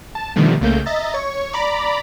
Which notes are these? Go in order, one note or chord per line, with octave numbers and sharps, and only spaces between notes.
A5
B2 D3 D#3 F3 G3 A3
C2 C#3 A3 A#3 G6
D#5 E5 A#5 A6
C#5 C#6
D5 A#5 B5 D6